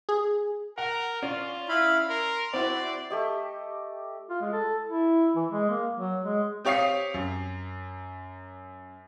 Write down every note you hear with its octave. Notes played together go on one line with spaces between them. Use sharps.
G#4
A#4 F#5
C#4 F4 D5
E4 F5 B5
A#4 C6
C4 E4 F#4 D5
A3 G4 D#5
F4
G#3
A4
E4
E3
G#3
A#3
F#3
G#3
C4 G4 C#5 F5 D#6 C7
F#2